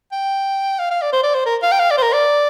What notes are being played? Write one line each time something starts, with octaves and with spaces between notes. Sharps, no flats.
G5
F5
F5
D5
C5
D5
C5
A#4
F5
G5
F5
D5
C5
A#4
D5